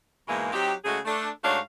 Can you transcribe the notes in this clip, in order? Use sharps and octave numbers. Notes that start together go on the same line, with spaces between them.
G#2 B2 E3 G#3 A#3
F#3 C4 D#4 G4
C#3 G#3 A3 F#4 G#4
A3 D4 A4
G#2 A3 D4 F#4 C#5 F5